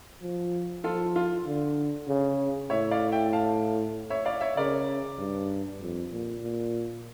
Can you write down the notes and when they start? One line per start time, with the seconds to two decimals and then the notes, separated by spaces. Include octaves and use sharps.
0.22 F3
0.84 F3 F4 A4
1.16 F4
1.46 D3
2.08 C#3
2.70 A2 C#5 E5
2.91 D5 F5
3.12 E5 G5
3.33 F5 A5
4.10 C#5 E5
4.25 D5 F5
4.41 C#5 E5
4.57 C#3 A#4 D5
5.19 G2
5.82 F2
6.12 A#2
6.43 A#2